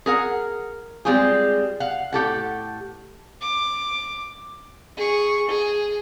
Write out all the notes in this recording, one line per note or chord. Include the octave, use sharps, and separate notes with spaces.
G#4 A#4 F#5
G3 G#3 C4 F4 G4 G#4
F5 F#5
A2 G4 A4 F#5
D6
G#4 C#6
G#4